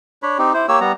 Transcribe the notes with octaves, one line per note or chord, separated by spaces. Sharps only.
D4 C#5 B5
C4 D#4 G4
E4 C5
A#3 G4 C#5 E6
G3 B3 A#5